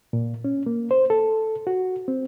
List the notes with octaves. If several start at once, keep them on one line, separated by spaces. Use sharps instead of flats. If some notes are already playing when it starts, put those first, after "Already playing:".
A#2
C#4
A#3
C5
A4
F#4
C4